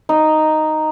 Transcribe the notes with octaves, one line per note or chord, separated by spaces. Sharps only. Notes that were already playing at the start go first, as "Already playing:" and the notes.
D#4